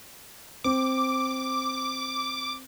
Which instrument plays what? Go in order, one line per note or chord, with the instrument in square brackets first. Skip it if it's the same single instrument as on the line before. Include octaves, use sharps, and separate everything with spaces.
[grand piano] C4 [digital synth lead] D6